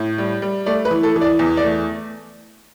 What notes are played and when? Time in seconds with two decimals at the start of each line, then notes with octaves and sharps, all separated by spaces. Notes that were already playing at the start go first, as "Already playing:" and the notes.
Already playing: A2
0.18 G3
0.42 G3
0.66 A3 D5
0.85 B4
0.91 E3
1.03 A4
1.16 E3
1.21 D5
1.39 E2
1.57 D5
1.64 A3